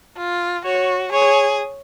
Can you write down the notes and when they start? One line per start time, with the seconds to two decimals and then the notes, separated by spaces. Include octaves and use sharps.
0.17 F4
0.65 F#4 C#5
1.12 G#4 C#5